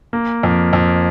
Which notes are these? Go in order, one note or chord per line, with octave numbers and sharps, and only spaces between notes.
A#3
F2
F2